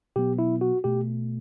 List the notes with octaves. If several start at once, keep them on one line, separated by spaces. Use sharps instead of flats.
B2 F#3 B3 G4
E4
F#4
B2 A3 G4